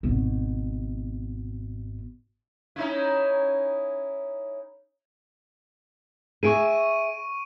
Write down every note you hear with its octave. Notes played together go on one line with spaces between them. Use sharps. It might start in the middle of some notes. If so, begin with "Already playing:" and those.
G#1 B2
C#4 D#4 E4
G#4 E5 C#6 D7 D#7